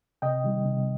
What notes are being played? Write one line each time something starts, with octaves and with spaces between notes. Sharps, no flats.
C3 D#5 G5
D#3 G3
C3